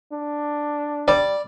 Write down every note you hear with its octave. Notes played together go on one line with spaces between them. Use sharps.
D4
G3 D5